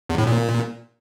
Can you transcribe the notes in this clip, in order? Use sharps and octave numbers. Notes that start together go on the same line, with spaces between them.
E2
A2
A#2